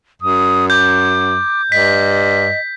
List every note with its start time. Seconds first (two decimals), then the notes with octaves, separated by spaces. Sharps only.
0.22 F#2 D#6
0.70 D6 G6
1.72 G2 D#5 B6